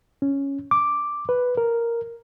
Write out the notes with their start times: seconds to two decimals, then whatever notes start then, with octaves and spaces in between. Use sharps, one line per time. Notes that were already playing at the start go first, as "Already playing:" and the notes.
0.22 C#4
0.71 D6
1.29 B4
1.57 A#4